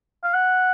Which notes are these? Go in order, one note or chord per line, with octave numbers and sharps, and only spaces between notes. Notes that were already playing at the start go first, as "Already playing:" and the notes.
F5
F#5